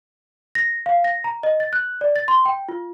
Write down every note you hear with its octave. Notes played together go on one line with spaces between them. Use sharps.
A#6
F5
A#6
A#5
D#5
A6
F#6
D5
A6
C6
G5
F4